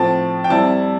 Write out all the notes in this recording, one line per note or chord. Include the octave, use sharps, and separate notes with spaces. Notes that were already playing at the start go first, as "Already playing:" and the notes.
Already playing: A2 F3 C4 A5
G5
C3 G3 C4 E4 A5